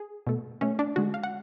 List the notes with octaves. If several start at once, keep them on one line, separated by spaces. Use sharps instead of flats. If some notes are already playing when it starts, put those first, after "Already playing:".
Already playing: G#4
B2 A3
B2 A3 C#4
D4
D3 G#3 F#4
F5
F#5